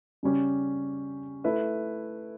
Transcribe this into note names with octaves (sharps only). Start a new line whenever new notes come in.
C#3 G3 C#4 G4
A3 E4 B4 E5